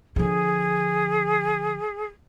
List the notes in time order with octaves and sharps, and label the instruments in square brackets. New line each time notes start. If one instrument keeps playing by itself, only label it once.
[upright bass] D3 F3 [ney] G#4